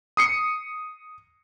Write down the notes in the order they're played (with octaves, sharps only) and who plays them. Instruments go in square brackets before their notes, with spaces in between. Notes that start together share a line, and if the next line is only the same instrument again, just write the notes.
[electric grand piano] D#6 C7 C#7